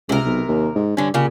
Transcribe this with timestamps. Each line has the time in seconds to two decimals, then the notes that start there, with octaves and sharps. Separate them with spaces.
0.09 C#2 C3 A#4
0.25 B1
0.48 D#2
0.76 G#2
0.97 G2 D3 C#4
1.14 A#2 C#3 G4